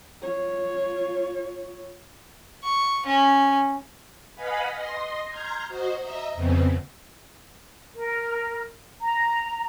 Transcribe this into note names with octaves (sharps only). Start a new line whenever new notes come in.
F4 C#5
C#6
C#4
B4 D#5 F5 F#5 G#5 B5
D#5 C6 A#6
A#5 C6 F6 G6 G#6
F#4 C5 D#5
D#5 E5 A#5
F2 C#3 B3 C4
A#4
A#5